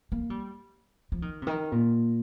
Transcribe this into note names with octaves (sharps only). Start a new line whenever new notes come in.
A#3
G3
F3
D#3
C3
D#3
A#2